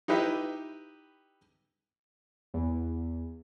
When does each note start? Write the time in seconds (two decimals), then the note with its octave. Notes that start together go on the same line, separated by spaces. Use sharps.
0.08 D#4 E4 G4 B4 E5
2.54 E2